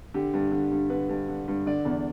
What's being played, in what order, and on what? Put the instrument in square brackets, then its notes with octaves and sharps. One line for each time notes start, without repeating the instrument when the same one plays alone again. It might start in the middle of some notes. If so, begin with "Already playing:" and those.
[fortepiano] D3 G4
G2
D3
G2
D3 B4
G2
D3
G2
D3 D5
E2